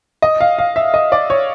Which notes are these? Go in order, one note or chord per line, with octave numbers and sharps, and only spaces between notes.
D#5
F5
F5
E5
D#5
D5
C#5